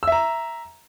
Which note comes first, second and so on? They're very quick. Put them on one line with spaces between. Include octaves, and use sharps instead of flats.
E6 E5 A#5